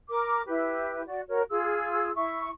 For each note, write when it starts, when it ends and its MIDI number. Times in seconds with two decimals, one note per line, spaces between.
0.09 0.41 70
0.09 0.41 86
0.46 1.01 64
0.46 1.01 67
0.46 1.01 71
1.07 1.20 66
1.07 1.20 74
1.28 1.41 66
1.28 1.41 70
1.28 1.41 73
1.49 2.10 65
1.49 2.10 68
1.49 2.10 88
2.14 2.48 64
2.14 2.48 85